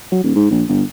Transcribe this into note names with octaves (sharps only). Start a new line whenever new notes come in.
F#3
D#1
G#2
A#1
G1